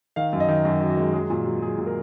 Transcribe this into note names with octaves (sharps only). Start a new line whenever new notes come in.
D#3 F5
F#2
D#5
D#3
F#2 F#4
F#2
F#4
G#3
F#3 G#4
A#2
F#3
F#3 G#4
A#2
A#4